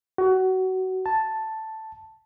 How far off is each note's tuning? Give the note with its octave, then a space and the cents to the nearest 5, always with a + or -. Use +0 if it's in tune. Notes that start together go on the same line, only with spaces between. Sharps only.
F#4 +20
A5 +0